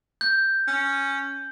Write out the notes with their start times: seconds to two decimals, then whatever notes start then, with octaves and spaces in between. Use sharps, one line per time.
0.21 G6
0.68 C#4